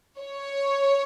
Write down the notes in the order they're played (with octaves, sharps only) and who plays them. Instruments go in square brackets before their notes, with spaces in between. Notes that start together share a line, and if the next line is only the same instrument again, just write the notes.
[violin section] C#5